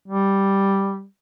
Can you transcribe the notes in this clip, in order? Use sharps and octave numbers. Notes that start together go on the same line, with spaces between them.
G3